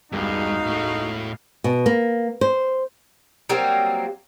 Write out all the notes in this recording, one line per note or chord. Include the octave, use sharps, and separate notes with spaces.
E1 C#2 G2 D#4 F#4 F5
A2 A3
B2
A#3
C5
F#3 G3 A#3 C4